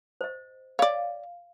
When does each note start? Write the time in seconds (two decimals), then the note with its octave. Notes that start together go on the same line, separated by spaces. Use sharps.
0.21 C5 D#5
0.79 C#5 D5 F5